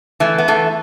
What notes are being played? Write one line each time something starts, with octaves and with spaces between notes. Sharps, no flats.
E3 A3
B3
E3 A3